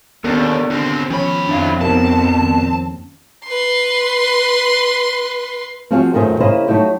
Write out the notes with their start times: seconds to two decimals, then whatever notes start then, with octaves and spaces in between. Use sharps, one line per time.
0.24 D#2 B3 C#4 D4 A4 A#4
0.70 D#2 D3 C4 C#4
1.10 D#3 F3 C#4 C#5 B5
1.49 F2 C4 D4 E5 F5
1.81 A#2 B3 D#4 G4 A#4 A5
2.41 D#3 A#3 C#4
3.46 B4 C6
5.91 F3 C4 F4 F#4 G#4 F5
6.13 F#2 A#2 D#3 A3 G#4 C5
6.40 C#3 A#3 E4 G#4 C5 D#5
6.68 F#3 A3 D#4 E4 G4